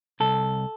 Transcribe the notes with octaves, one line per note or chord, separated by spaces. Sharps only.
C2 A4